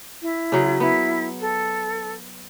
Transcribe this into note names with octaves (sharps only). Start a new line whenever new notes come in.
E4
C#3 F#3
B3 E4
A4